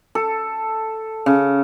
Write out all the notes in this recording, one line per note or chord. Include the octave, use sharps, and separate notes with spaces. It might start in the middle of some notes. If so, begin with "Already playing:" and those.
A4
C#3